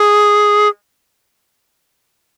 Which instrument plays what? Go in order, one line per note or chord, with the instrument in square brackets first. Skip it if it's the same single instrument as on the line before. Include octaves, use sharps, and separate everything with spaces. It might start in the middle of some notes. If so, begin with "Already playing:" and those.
Already playing: [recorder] G#4